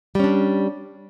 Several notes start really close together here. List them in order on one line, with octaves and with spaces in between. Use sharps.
G3 C#4 D4